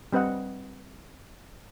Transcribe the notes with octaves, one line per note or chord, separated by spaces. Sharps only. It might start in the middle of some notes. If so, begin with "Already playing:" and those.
G3 C4 B4 D#5 F#5